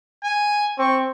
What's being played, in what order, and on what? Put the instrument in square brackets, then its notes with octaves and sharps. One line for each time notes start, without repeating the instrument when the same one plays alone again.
[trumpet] G#5
[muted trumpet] C4 [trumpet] C#6